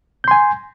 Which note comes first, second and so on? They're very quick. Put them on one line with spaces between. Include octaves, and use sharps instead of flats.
G6 C6 G#5